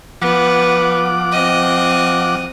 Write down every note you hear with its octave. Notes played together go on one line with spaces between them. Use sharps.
F3 B3 F#5 D6
C4 D#5